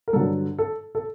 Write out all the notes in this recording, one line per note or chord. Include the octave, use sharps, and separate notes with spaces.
A#4
G2 D3 F#3 A4
A4
A4